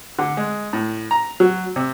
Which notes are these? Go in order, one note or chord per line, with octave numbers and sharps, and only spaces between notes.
D3
G#3
A2
A#5
F#3
C3